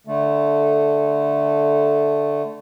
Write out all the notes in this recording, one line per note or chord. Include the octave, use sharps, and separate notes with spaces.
D3 A3